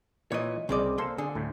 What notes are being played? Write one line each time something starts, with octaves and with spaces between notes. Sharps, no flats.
A#2 E3 C#5 D#5
C2 C#3 C4 D5 D#5
A#3 A4 C5 C6
D3 G#4
D2 A2